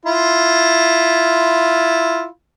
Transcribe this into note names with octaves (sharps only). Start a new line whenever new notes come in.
E4 F4